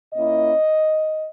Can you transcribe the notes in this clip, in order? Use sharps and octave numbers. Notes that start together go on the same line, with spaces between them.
A#2 A#3 C#4 E4 D#5